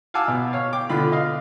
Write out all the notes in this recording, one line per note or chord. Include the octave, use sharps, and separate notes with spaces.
F5 F#5 G#5 A5 D6 E6
B2
C#5 F5
G5 D6
B2 D3 F4 B5
D#5 F5